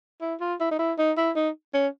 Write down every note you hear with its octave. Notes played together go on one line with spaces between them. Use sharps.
E4
F4
E4
D#4
E4
D#4
E4
D#4
C#4